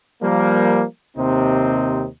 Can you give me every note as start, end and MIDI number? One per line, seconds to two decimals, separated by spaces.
0.22 0.83 53
0.22 0.83 55
0.22 0.83 58
1.16 2.06 39
1.16 2.06 48
1.16 2.06 60
1.16 2.06 63